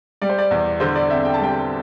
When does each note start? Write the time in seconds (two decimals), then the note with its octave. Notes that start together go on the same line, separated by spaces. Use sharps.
0.22 G3 D5
0.29 C5
0.38 D5
0.51 E2
0.80 D3 C5
0.95 D5
1.10 C4 E5
1.25 G5
1.34 A5
1.40 G3 G5